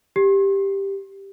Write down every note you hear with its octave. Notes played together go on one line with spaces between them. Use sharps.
G4